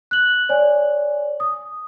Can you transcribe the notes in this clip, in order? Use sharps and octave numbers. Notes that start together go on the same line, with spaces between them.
F#6 F#7
C#5 D5 G#5
D#6